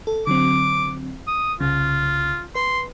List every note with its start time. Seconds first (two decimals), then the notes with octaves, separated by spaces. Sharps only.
0.07 A4
0.27 D3 F#3 C4 D6
1.27 D#6
1.60 C2 C#3 F4
2.55 B4 C6